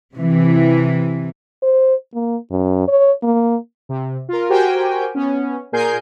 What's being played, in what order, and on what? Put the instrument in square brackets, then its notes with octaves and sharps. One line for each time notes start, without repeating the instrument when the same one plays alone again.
[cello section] C3 E3
[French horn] C5
A#3
F#2
C#5
A#3
[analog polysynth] C3
F4 A#4
F#4 G4 A#4 C5 G5 G#5
B3 C#4
A#2 G#4 A#4 G#5 G6 C7